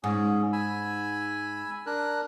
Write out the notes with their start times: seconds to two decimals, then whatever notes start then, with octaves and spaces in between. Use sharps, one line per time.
0.04 G#2 C#4 G#4
0.53 G#5 B5 E6
1.86 D4 A#4 F#6